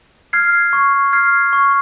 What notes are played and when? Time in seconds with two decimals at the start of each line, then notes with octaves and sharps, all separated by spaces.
0.33 F6 G#6 C7
0.73 C#6
1.13 F6 G#6 C7
1.53 C#6